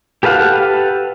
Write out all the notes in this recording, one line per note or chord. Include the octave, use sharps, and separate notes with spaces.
G4 A4 B4 F5 F#5